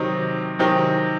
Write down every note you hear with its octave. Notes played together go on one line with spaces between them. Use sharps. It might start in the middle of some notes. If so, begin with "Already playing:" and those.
Already playing: C3 D#3 F#3 C4 D#4
C3 D#3 F#3 C4 D#4